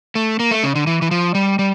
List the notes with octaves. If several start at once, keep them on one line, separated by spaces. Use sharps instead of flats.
A3
A#3
A3
C#3
D3
E3
E3
F3
G3
G3